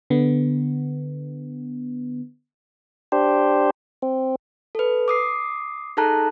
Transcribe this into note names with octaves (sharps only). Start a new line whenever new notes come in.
D3 B3
D4 G4 C5
C4
A4 B4
D6 D#6 C7
D#4 G#4 A4 A5 A#5 F#6